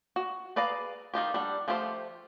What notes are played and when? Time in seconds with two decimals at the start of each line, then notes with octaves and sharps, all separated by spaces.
0.16 F#4
0.56 G#4 B4 D5 F5 A#5
1.14 D#3 D#4 F4 G4
1.34 G3 D4 F#5
1.68 F3 A3 F4 G4 C5